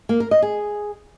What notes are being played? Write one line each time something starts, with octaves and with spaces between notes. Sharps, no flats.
A#3
A#4
D#5
G#4